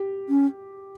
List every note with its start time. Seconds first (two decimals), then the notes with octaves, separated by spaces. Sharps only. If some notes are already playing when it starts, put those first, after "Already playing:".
Already playing: G4
0.29 C#4